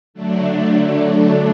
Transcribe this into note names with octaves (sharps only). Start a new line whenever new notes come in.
D3 F#3 A3 D4